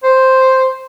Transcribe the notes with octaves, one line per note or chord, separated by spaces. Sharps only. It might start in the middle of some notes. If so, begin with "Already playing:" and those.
C5